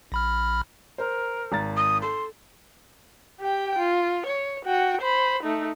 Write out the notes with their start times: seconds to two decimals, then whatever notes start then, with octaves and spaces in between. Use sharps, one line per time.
0.12 A#1 B5 F6
0.98 A#4 C5
1.52 G#1 A#5 A6
1.77 D#6
2.02 A4 C6
3.40 G4 G5
3.79 F4
4.27 C#5
4.65 F#4 G5
5.01 C5 B5
5.43 A3 D#4